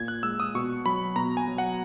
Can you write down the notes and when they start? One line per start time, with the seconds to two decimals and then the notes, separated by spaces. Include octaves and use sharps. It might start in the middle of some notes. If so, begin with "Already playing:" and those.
Already playing: A#2 G#6
0.08 F#6
0.23 G#3 E6
0.40 D#6
0.55 B2 C#6
0.86 F#3 B5
1.16 B2 A#5
1.37 G#5
1.48 F#3
1.58 F#5